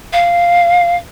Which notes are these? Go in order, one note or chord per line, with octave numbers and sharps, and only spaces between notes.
F5